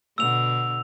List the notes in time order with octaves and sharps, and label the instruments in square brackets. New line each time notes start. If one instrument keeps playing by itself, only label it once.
[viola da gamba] B2 D3 [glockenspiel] E6 F7